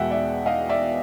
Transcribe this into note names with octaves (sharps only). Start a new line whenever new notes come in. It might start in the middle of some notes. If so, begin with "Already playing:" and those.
Already playing: E2 B2 G#3 E5 F#5 G5
D5 E5
D#5 F5
D5 E5